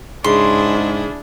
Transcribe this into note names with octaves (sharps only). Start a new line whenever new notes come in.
G#2 C#3 D4 E4 G#4 C6